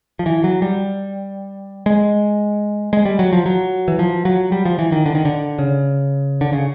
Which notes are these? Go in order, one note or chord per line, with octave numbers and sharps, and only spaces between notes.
F3
E3
F#3
G3
G#3
G#3
G3
F#3
F3
F#3
E3
F3
F#3
G3
F3
E3
D#3
D3
D#3
D3
C#3
D3
C#3